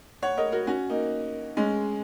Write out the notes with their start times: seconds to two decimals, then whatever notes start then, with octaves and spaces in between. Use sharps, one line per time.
0.22 C#5 F#5
0.37 A#4 D#5
0.52 F#4 A#4
0.67 C#4 F#4
0.90 A#3 D#4
1.57 G#3 C#4